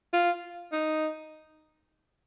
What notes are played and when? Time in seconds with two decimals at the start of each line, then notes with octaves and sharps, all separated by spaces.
0.13 F4
0.72 D#4